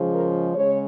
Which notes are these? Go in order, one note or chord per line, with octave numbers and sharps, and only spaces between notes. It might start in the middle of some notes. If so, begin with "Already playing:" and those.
Already playing: C#3 F3 G#3
A#4
C#3 G#3 C#5